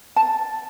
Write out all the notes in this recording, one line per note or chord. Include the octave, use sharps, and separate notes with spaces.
A5